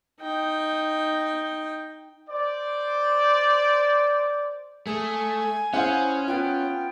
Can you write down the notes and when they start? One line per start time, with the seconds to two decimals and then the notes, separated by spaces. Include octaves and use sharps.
0.21 D#4 G5
2.29 C5 D5
4.87 A3 G#4 G#5
5.74 C#4 E4 G#4 C5 F5 F#5
6.28 B3 F4 G5